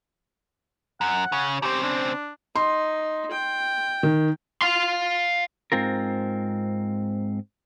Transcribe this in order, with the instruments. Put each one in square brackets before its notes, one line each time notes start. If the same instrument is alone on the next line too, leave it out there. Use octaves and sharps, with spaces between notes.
[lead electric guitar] F#2 [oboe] F#5
[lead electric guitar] C#3
[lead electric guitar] C#3 C4 [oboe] G4
[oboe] D4
[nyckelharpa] D#4 [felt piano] C6
[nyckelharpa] G5
[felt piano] D#3
[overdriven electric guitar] F5 C6
[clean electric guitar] G#2 C4 F4 A#4